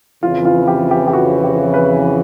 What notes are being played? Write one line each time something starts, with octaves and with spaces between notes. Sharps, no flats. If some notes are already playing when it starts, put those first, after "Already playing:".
F2 C#3 E3 F4
F4
G4
G4
G4
F#4
G4
B4